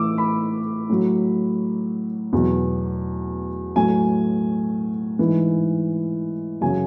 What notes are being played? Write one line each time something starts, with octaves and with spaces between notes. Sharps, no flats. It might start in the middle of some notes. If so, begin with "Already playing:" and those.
Already playing: A2 E3 D6 E6
B5
A2 F#3
E2 B2 F#3
A2 F#3 G#5
G#2 E3
F#2 C#3 F#3 G#5